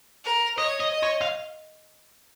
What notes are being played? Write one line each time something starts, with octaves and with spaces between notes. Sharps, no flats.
A#4
C#5 D#5
D#5
D#5
C#5
F5